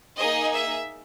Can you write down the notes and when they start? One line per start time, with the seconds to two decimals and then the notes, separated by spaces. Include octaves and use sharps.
0.18 A#3 D#4 G#4 D#5
0.55 E5